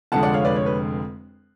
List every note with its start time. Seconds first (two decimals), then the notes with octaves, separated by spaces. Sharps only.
0.12 F1 F2 D3 G#3 F#5 A5
0.23 D5 F#5
0.33 C#5 F5
0.45 B4 D5
0.56 C#5
0.66 B4